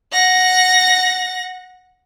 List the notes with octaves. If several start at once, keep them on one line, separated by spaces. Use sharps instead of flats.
F#5 A#6